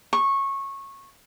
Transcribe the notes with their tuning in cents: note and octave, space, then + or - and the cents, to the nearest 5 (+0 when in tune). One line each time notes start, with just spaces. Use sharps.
C#6 -15